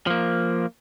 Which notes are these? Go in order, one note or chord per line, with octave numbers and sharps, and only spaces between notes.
F3 A#3